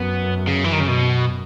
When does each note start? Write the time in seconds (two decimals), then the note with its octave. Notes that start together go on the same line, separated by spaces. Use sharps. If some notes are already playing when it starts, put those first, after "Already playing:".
Already playing: F#2 B3
0.47 C#3
0.64 E3
0.73 D#3
0.80 C#3
0.88 B2